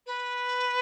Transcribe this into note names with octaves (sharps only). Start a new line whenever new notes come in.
B4